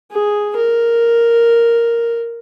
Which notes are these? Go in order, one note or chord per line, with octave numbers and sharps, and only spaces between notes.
G#4
A#4